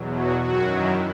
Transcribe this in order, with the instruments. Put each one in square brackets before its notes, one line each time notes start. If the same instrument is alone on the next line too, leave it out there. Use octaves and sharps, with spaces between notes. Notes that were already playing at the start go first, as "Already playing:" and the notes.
Already playing: [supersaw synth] E2 B2 F#3
F#4
F#2 D#3 F#3 F#4
E4